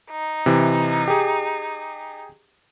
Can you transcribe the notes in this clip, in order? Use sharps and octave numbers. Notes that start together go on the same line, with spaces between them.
D#4
C3 E3
G4 G#4